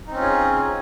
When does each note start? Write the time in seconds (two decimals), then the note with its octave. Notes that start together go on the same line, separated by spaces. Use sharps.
0.07 D#4
0.11 C4
0.14 C#4
0.18 F4
0.22 G#4